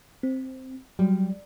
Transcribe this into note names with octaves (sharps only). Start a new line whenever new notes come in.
C4
F#3 G3